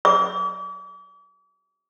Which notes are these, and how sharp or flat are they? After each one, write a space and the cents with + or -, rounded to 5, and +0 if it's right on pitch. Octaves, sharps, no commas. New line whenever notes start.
D6 -45